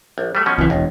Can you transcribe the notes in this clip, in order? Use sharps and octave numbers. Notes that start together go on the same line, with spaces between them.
A#1
G3 A3
B2 F3 C#4
C2 E3
E1 C#2